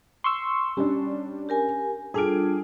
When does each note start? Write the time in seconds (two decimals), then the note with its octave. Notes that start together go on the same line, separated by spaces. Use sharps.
0.24 C6 C#6 E6
0.77 G3 C#4 D4
1.49 G4 A#4 G#5
2.14 G3 D4 F4 G#4 A4 D7